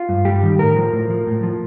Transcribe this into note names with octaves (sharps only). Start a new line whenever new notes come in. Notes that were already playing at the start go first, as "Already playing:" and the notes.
Already playing: F4
G2
G3 G4
D#3
A2 A#4
F3
A2
F3
A2
F3